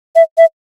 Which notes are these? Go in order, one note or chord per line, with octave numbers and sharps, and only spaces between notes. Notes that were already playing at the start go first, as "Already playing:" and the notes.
E5
E5